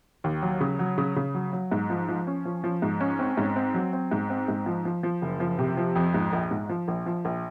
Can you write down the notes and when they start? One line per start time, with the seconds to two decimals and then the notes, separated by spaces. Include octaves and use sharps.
0.24 D#2
0.42 F#3
0.61 C#3
0.79 F#3
0.98 C#3
1.16 C#3
1.34 F#3
1.53 F#3
1.72 G#2
1.90 F3
2.09 F3
2.27 C#4
2.45 F3
2.64 F3
2.82 G#2
3.00 C#4
3.19 C4
3.37 G#2
3.56 C4
3.74 F#3
3.93 C4
4.11 G#2
4.30 C4
4.48 G#2
4.66 F3
4.85 F3
5.03 F3
5.22 F#1
5.40 F3
5.59 C3
5.77 F3
5.96 F2
6.14 G#2
6.33 A#1
6.51 G#2
6.69 F3
6.88 A#1
7.06 F3
7.25 A#1